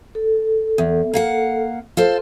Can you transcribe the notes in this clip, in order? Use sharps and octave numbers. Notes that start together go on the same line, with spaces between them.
A4
E2
A#3 F5 F#5
F4 A4 C5